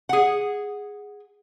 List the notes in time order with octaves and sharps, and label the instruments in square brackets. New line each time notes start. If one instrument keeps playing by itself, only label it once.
[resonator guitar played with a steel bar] G#4 F#5